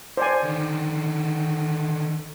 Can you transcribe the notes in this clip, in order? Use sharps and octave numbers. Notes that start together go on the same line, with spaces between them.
C5 D5 G#5
D3 D#3